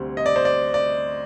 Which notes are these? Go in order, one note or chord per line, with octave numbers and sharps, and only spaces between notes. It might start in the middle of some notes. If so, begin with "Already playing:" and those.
Already playing: D2 C3 G3 C4
D#5
D5
C5
D5
D5